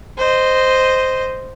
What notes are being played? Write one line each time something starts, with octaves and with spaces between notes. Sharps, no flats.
C5 D#5